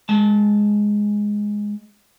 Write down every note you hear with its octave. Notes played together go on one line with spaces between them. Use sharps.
G#3 A5